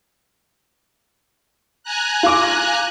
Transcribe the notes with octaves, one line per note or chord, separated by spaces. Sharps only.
G#5 A#5 F#6
F4 D6